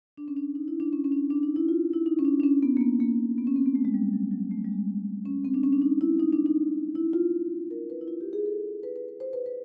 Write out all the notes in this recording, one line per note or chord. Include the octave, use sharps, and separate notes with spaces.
D4
C#4
D4
D#4
E4
D4
C#4
C#4
D4
D4
D#4
E4
F4
E4
D#4
C#4
D4
D4
C#4
B3
A#3
B3
A#3
B3
C#4
C4
B3
A3
G#3
G3
F#3
F#3
A3
G#3
G3
G#3
C#4
C4
D4
C#4
D4
D#4
E4
D#4
D4
D#4
E4
F4
A#4
B4
E4
F4
G4
G#4
A4
B4
B4
B4
C5
B4
B4